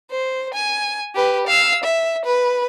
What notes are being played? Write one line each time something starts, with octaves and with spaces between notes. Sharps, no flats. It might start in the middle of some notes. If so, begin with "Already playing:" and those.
C5
G#5
G4 B4
F5 E6
E5
B4